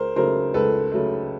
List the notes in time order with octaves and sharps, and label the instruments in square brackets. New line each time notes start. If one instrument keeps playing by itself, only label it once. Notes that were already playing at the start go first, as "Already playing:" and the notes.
Already playing: [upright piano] C#2 A#4 C5
C#3 F#3 A3 A#4 C5
C#2 A4 B4
C#3 F#3 A3